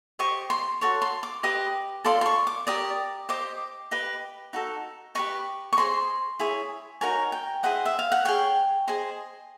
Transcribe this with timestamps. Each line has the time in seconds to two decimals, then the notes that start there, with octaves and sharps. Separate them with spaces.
0.19 G4 C5 D#5 C#6
0.50 C6
0.81 F#4 A4 C#5 C#6
1.02 C6
1.23 D6
1.43 G4 B4 D#5 D#6
2.05 F4 A4 D5 C6
2.21 C6
2.26 C#6
2.47 D6
2.67 G4 A#4 D5 D#6
3.29 G4 C5 D#5 D6
3.91 G4 B4 D#5
4.53 D#4 F#4 A4
5.15 G4 B4 D#5 C#6
5.73 C#6
5.77 G#4 C5 D#5 C6
6.39 E4 G#4 C#5
7.01 D#4 F#4 A#4 C#5 G#5
7.32 G5
7.63 E4 G#4 C5 D#5 F#5
7.85 E5
7.99 F5
8.12 F#5
8.25 G#4 C#5 G5
8.88 G#4 C5 D#5